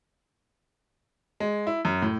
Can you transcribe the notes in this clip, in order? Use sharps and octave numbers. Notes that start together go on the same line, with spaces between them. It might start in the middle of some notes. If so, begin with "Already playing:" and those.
G#3
E4
F#2
A2